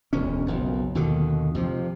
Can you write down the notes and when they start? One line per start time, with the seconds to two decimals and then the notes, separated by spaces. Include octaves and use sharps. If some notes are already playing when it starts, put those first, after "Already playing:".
0.13 E1 D2 C#4
0.46 F#1 B1 F2
0.95 D#2 B2 D3 D#3
1.55 F2 C3 F3